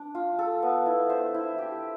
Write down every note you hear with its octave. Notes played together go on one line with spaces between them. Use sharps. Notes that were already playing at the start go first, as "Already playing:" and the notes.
Already playing: D4
F4
A4
B3
E4
C5
E4
G4